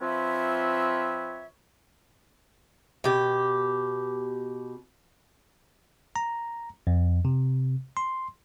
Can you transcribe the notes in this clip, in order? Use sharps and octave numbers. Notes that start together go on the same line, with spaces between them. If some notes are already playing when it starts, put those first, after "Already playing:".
F3 C4 F4 B4 C#5 E5
B2 G4
A#5
F2
C3
C6